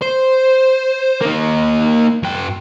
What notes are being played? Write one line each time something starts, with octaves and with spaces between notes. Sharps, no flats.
C5
A#3 D#4
F#2 G5